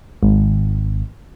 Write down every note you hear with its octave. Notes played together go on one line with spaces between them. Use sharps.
G#1